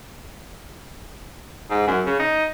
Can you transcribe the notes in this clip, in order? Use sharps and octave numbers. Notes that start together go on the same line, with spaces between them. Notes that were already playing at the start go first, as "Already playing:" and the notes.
G#2
F#2
C#3
D#4